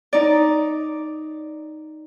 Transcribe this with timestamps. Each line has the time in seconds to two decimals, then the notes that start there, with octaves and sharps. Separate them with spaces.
0.13 D#4 D5